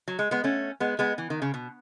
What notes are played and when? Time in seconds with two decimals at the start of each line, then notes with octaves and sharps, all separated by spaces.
0.08 F#3
0.19 G#3
0.31 G#3 B3
0.44 A3 C#4
0.80 G#3 B3
0.99 G#3 B3
1.18 E3
1.30 D#3
1.42 C#3
1.54 B2